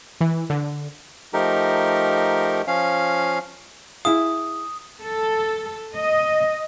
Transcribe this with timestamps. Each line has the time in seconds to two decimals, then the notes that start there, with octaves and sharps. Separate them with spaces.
0.21 E3
0.50 D3
1.34 F3 A3 D#4 G4 A#4
2.67 F3 C#4 F5
4.05 E4 G#4 F5 D#6
5.03 A4
5.95 D#5